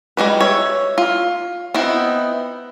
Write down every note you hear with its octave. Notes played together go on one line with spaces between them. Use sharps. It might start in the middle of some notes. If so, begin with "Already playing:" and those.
G3 G#3 D4 B4
C#5 E5
F4
B3 C4 D#4 E4